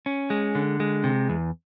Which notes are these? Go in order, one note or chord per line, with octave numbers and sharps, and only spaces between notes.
C#4
G#3
D3
G#3
C3
E2